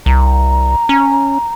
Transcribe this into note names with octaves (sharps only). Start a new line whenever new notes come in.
C2 A#5
C#4